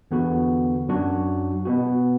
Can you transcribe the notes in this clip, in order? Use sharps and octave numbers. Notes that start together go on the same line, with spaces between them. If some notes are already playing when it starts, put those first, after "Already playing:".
E2 D3 B3 F#4
F#2 F#3 D4 F#4
B2 B3 F#4